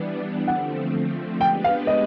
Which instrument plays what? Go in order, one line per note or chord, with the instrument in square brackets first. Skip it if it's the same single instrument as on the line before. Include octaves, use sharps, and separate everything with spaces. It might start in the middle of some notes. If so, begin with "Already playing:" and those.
Already playing: [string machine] E3 G3 B3 D4
[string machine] D3 F3 A3 C4 [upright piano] F#5
[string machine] G#3 B3 D4 G4 B4 [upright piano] G5
[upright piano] F5
D#5